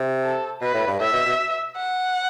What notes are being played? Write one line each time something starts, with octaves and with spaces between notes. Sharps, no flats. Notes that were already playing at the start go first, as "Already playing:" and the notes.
Already playing: C3
A4
B2 B4
A2
G2
A2 E5
B2
B2
F#5